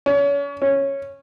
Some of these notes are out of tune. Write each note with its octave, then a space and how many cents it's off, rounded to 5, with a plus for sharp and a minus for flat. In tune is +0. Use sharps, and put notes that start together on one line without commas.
C#4 +35
C#4 -10